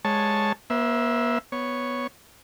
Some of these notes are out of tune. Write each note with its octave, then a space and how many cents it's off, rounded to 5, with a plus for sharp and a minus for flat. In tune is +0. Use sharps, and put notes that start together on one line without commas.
G#3 +0 C#5 -5 A5 +0
A#3 +45 C5 +0 E5 +0
B3 +0 C#5 +0